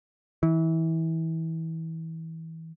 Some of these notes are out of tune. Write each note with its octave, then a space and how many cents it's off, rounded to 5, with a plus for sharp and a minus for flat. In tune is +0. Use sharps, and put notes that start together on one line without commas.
E3 -25